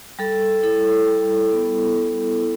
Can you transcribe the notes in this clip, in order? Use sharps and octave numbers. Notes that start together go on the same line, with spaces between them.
G3 A4
E4 A4
G3
B3
G3
E4